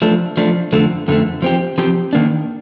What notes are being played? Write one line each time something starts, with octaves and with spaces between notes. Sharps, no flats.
F3 A3 D4
F3 A3 D4
F2 D3 F3 A3
F2 D3 F3 A3
F3 C4 G4
F3 C4 G4
D#3 A#3 D4